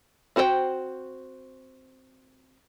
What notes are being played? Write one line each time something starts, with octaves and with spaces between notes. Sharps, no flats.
C4 F#4 C5 C#5 G5